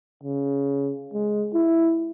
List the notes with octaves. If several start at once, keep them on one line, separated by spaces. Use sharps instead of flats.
C#3
G#3
E4